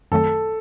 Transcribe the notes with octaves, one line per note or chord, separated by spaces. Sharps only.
F#2 D#3 F#3 A3 C4 A4